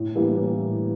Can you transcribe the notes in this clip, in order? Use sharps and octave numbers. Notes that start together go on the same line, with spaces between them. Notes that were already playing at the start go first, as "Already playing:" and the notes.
Already playing: A2
E3 G3 A#3
A2